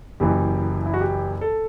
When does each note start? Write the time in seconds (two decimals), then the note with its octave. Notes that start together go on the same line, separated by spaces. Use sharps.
0.20 F#1 F#2 E3 G4
0.86 E4
0.94 F#4
1.01 G4
1.41 A4